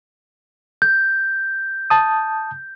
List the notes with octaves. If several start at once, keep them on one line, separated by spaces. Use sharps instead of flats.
G6
A5 D#6